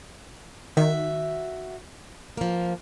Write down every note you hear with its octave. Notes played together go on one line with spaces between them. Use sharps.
D#3 F#4 E5
F3 A#3